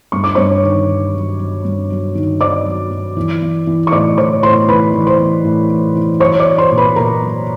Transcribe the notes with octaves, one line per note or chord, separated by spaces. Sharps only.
G2 C#6
D6
G2 C#5 C#6
D#3
D#3
F#3
F#3
G2
F#3
D#3
D#3 D5 D6
F#3
F#3
E3
E3
E3
C#6
A2 D5 D6
E3 C#5 C#6
A2 C5 C6
E3 B4 B5
E3
C5 C6
E3
A2
E3
E3
F#3 C#5 C#6
D5 D6
F#3
C5 C6
A#2
B4 B5
A#2 A#4 A#5
F#3